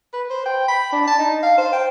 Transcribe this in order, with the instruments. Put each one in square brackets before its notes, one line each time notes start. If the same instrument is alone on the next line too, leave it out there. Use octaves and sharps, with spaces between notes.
[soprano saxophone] B4
C5
G5
B5
D4
A5
D#4
F5
C5
G5